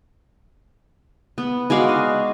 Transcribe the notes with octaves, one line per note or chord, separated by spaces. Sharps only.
B3
G#3 F#4 D5 F5
D#5